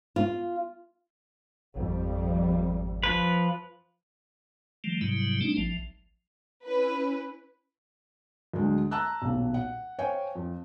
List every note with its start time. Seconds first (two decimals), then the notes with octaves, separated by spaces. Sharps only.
0.16 F4
1.76 G#1 F2 G3
3.03 F3 B4
4.84 D#3 F3 G3 A3
5.01 G#2 C3 F#3 G3 E4
5.41 G3 A3 C4 D4 D#4
5.57 A1 F3
6.64 C#4 E4 B4
8.53 D2 F#3 G#3 D4
8.91 A5 A#5 E6 F#6
9.22 D#1 B1
9.54 F#5
9.99 C5 C#5 F5 G5 G#5
10.35 F2